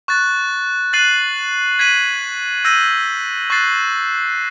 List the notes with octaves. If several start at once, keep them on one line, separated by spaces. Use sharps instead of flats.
C#6 F#6 A6
F#6 A6 C7 D#7 F#7
G#6 B6 D#7 F#7
E6 G6 A#6 D#7 F#7
C#6 F#6 A6 C7